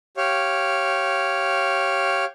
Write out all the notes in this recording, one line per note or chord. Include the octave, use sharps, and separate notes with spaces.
G4 C#5 F5